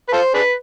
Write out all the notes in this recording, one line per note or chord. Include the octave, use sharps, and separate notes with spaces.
B4
F4 A4 C5
D4 G#4 B4